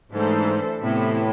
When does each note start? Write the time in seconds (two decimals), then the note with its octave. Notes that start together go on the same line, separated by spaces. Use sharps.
0.12 G#2 E3 A3 D4 A4 C5
0.80 A2 C3 E3 B3 E4